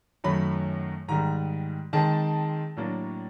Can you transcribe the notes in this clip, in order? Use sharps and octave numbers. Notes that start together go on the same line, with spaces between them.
F#2 D#3 F#3 A3 B5
G#2 D#3 G3 A#5
D#3 G#3 C4 A5
A2 F#3 A#3 D4